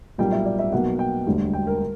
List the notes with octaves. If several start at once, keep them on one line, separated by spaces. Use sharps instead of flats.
B1 A#2 G3 A#3 G5
E5
D5
E5
B1 B2 A#3 F#5
G5
E1 D2 D3 G3
G5
A#4